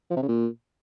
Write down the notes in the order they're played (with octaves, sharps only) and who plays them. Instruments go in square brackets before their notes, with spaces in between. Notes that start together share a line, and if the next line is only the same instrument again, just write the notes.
[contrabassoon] F3
C3
C#3
A#2